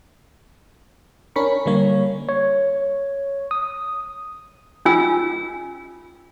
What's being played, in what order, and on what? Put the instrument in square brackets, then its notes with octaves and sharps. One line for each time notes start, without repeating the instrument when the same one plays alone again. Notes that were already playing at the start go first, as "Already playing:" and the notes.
[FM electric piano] C#4 D4 A#4 B5 C#6
D3 G3 A#3 C#5
[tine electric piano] C#5
D#6
[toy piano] C#4 F4 G#5 E6